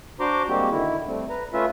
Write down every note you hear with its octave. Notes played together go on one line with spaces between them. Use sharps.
D4 F#4 C5 A#5 C6 D6
G3 G#3 A#3 C4 F#4 G4
D3 D#3 E4
G3 A3 C4
B4 A#5
A3 C#4 F4 B4 E5